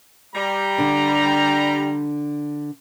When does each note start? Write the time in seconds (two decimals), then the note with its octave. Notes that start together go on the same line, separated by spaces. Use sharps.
0.34 G3 A#5
0.78 D3 D4